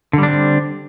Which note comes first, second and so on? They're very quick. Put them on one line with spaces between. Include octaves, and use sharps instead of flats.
D3 G3 D4 C4